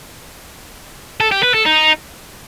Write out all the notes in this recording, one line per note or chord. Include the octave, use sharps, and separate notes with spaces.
A4
G4
B4
A4
D#4